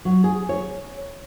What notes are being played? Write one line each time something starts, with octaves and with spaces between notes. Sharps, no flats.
F#3
G#4
C#5